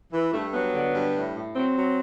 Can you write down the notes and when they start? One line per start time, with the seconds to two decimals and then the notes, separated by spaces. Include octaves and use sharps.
0.13 E3
0.33 G2 A3
0.54 F#3 B3
0.74 D3
0.94 G2
1.15 A2
1.35 A2
1.55 F#3 C4
1.76 F#3